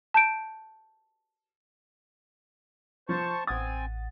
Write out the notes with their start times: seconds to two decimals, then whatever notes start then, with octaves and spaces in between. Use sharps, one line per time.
0.14 A5 G6 D7
3.09 F3 C5 A5 C#6
3.47 A1 C4 F#5 G#5 D#6 A6